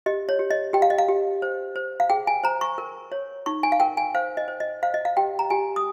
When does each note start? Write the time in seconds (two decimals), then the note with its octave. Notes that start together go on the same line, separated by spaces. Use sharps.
0.06 G4 D#5
0.29 C#5
0.39 G4
0.51 D#5
0.73 G4 G5
0.82 F5
0.90 D#5
0.98 F5
1.08 G4
1.42 C5
1.76 C5
2.00 F5
2.10 G#4 G5
2.27 G#5
2.44 C5 A#5
2.61 C#6
2.78 A#4
3.12 C#5
3.46 D#4 C#6
3.63 G#5
3.72 F5
3.80 A#4 G5
3.97 G#5
4.15 C5 F5
4.37 D#5
4.48 C5
4.60 D#5
4.83 C5 F5
4.94 D#5
5.05 F5
5.17 G4 G5
5.39 A#5
5.50 G4 G#5
5.76 D#6